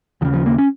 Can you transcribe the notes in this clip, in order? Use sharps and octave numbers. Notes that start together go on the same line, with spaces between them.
D#2 C#3 D#3
F3
A#3
C#4